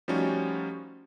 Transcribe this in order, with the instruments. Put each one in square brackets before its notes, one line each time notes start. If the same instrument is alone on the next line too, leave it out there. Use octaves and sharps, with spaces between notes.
[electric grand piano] F3 G3 A3 C#4 D#4 F#4